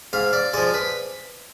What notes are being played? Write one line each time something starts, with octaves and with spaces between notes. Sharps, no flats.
G#2 F5
D5
F3 G#3 D5
B4